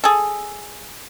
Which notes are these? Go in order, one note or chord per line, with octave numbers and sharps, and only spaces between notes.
G#4 A4